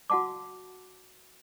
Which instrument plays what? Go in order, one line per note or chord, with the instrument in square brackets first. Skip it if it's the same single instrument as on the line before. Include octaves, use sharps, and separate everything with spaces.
[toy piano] F#4 F5 F#5 A5 D6